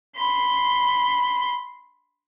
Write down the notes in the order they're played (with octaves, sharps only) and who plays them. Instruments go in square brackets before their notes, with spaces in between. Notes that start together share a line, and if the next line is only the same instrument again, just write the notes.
[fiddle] B5 C6